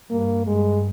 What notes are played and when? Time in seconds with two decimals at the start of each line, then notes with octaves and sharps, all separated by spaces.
0.11 G2 A#3
0.47 G2 G#3